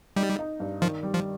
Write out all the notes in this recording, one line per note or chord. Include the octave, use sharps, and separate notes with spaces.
G3 D#4
D#4
G2
D#3 F3
G3
F3